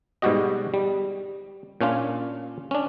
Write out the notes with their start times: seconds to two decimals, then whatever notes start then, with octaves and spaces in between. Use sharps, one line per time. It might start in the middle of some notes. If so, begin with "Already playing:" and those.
0.22 G#2 B2 G3 F#4 G4 D#5
0.74 G3
1.81 A#2 C#4 D4 F4
2.71 C#4 D4